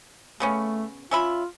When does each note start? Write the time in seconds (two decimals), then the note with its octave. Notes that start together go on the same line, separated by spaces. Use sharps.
0.40 C#3 A3 B3 C#4
1.11 C#4 F4 E5 B5